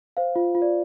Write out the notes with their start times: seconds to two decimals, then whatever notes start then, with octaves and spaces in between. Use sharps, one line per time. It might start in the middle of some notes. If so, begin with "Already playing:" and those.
0.17 C5 F5
0.36 F4
0.55 F4
0.62 D5